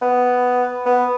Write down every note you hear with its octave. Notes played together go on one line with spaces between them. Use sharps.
B3
B3